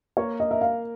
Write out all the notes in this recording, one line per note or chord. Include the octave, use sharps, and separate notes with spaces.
A#3 C#5
D#5
A#4 E5
F5